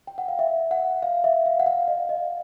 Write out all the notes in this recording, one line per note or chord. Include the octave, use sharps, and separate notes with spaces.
G5
F#5
F5
E5
F#5
F5
E5
F5
F#5
F5
D#5
D#5